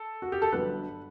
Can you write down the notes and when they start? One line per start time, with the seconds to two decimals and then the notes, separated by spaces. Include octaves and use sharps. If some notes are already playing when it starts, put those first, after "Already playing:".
Already playing: A4
0.22 F#4
0.32 G4
0.42 A4
0.52 G1 G2 D3 F#3 B4